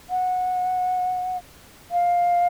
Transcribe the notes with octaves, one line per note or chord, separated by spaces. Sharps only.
F#5
F5